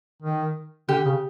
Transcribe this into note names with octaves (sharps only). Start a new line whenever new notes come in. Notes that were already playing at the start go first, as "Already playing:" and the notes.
D#3
D3 G4
C#3